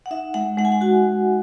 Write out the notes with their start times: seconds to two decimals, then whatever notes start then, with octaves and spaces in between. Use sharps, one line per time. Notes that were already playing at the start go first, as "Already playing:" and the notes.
0.06 F#5
0.11 D#4 E5
0.34 G#3 F#5
0.57 G#3 F#5
0.65 G#5
0.72 F#5
0.81 F#4 G#5
1.04 G#3